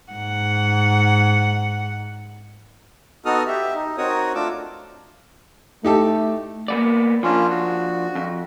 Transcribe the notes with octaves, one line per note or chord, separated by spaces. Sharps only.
G#2 F#5
B3 D#4 F#4 A4 D#6 F6
G4 E5
D#4
C4 D#4 F#4 A#4 C#5 D#6
A3 D4 F4 D6 E6
A3 D#4 G4 A4
A#3 B3 D5
F3 A#3 C#4 D4 F4
F#4
F2